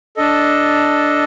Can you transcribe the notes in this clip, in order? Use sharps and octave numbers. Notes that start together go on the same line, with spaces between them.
D4 A4 D#5